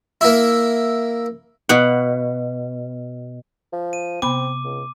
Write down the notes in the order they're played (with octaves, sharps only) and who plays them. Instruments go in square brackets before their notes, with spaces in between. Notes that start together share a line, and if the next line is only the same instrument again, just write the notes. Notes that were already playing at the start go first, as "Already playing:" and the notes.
[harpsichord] A#3 E4
[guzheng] B2 F5 F#5
[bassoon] F3
[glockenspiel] D#7
[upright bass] C3 [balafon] B3 B5 [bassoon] C4 [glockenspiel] D6
[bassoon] C#2